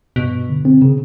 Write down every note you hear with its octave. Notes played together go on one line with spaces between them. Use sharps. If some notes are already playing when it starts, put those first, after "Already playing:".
G2 B2
G2
D3
C4
C#3